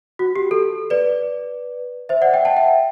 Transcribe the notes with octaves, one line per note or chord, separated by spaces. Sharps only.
F#4
G4
A4
B4 D5
C5 E5
D5 F#5
E5 G5
F#5 A5
E5 G5